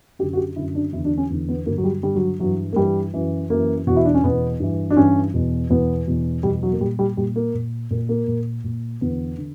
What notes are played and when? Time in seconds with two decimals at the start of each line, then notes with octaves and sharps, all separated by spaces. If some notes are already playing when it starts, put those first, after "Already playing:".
0.19 F#2 G4
0.23 D3
0.33 F#4
0.37 G4
0.56 F#2 D3 E4
0.75 D4
0.93 E2 E4
0.97 D3
1.05 D4
1.18 C#4
1.30 E2 D3
1.48 B3
1.66 G2 D3 A#3
1.78 F#3
1.84 G3
2.03 G2 D3 G3
2.15 F#3
2.39 G2 E3 F#3
2.73 A#3
2.76 G2 E3 G3
3.14 F#2 E3
3.50 F#2 E3 A#3
3.87 E2 B2 F#4
3.97 E4
4.05 D4
4.15 C#4
4.23 E2 B2 B3
4.60 G2 E3
4.90 D4
4.97 G2 E3 C#4
5.34 E2 B2
5.70 E2 B2 B3
6.08 E2 B2
6.43 E2 B2 G3
6.63 F#3
6.72 A#3
6.80 A#2 G3
6.99 G3
7.17 A#2 G3
7.36 A#3
7.54 A#2
7.91 A#2 A#3
8.09 A#3
8.28 A#2
8.64 A#2
9.01 E2 D3 B3
9.38 D3